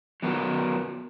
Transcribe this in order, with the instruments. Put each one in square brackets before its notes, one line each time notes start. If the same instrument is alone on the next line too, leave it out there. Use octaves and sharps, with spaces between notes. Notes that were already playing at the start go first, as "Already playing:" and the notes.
[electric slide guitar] F#3 B3 F#4 A#4